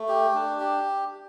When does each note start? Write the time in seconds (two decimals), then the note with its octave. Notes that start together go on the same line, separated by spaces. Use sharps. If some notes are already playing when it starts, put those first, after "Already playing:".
Already playing: A3
0.08 G4
0.35 D4
0.60 G4